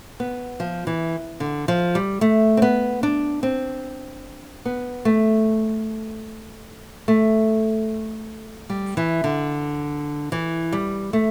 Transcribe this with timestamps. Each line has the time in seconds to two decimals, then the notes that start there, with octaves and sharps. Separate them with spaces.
0.20 B3
0.60 F3
0.87 E3
1.40 D3
1.68 F3
1.95 G3
2.21 A3
2.57 C4
2.62 B3
3.03 D4
3.43 C4
4.65 B3
5.05 A3
7.08 A3
8.70 G3
8.97 E3
9.24 D3
10.32 E3
10.72 G3
11.13 A3